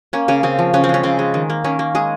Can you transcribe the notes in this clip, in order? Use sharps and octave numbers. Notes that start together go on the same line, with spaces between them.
A#3 C#4
C#3 C#4
C#3 C4
F3
C#3 C#4
C4
G#3 C#4
C#3 C4
G#3
D#3
A#3
D#3 C#4
A#3
G#3 G#4